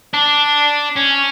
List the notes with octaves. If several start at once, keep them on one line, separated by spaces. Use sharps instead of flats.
D4
C#4